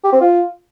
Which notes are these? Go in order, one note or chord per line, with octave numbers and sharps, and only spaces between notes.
G4
C4
F4